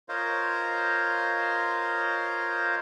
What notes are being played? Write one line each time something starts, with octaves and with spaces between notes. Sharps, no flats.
F4 A#4 C5 C#5 D#5 F5